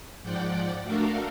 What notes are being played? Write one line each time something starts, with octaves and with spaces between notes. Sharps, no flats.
G#2 F3 D5 F#5 G5
A3 D4 F#4 A4 A#4 F5